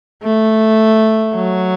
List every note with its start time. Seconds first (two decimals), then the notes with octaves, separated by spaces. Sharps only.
0.23 A3
1.35 F#3